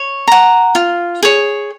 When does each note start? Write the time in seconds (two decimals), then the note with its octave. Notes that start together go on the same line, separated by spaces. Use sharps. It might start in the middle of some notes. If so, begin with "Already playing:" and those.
Already playing: C#5
0.28 F#5 A#5
0.75 F4
1.23 G#4 C#5